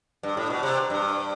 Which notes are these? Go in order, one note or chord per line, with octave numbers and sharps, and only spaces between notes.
G2
A2
B2
C3
G2